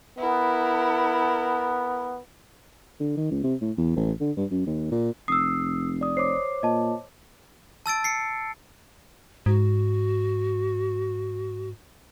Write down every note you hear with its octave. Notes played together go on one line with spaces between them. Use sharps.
B3 E4 A#4
D3
D#3
C#2
C3
A2
E2
A1
D3
G2
F#2
D#2
A#2
F1 D#6 E6 C7
D5 D#6
C5 C#5 D6 C7
A#2 D#5 A5
A5 E6 A6 D7
C7 C#7
G#2 F#4